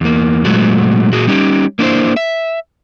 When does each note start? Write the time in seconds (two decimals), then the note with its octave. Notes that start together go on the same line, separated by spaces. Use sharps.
0.01 E2 A#3
0.45 A#2 F#3 G#3 A3 F#4
1.12 A#2 F#4 G#4
1.27 G3 C#4 D#4 G4
1.79 A#3 D4 E4 C5
2.16 E5